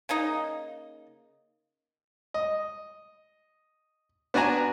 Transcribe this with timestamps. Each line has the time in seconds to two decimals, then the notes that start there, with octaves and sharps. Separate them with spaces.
0.09 C#3 A#3 D#4 D#5
2.34 D#5
4.34 B3 D4 F#4 G#5 A#5